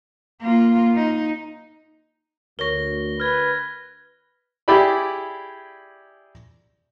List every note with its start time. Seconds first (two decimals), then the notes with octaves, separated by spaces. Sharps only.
0.41 A#3 F4
0.95 D#4
2.59 D2 A#4 C#5 C#6 A#6 G7
3.20 B4 F6 G#6
4.68 E4 G4 G#4 D5 B5